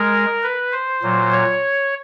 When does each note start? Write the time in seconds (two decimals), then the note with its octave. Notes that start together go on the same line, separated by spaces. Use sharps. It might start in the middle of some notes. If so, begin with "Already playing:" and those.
Already playing: G#3 A#4
0.43 B4
0.72 C5
1.02 A#2 F#3
1.32 C#5